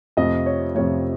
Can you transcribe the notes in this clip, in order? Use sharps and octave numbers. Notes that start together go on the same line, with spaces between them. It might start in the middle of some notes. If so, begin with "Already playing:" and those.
F2 C3 F3 A3 D#5
C#5
F2 C3 F3 A3 C#5